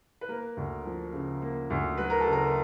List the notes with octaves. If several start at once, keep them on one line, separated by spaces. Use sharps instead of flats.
B4
A#3 A#4
D2
F3
C#3
A#3
D2
F#3 B4
A#4
A4
F#1
A#4